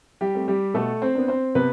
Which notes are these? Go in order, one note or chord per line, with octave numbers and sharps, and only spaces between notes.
G3 G4
A3 C4
G3 G4
B2 A3 A4
C4 C5
B3 D4
C4 C5
C3 B3 B4